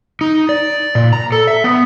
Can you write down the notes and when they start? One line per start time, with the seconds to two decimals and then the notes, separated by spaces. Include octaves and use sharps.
0.21 D#4
0.49 D5
0.95 A#2
1.13 A#5
1.32 A4
1.47 E5
1.64 B3